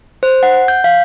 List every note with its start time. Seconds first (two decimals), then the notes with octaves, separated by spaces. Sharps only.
0.23 C5
0.43 F#5
0.68 G6
0.84 F5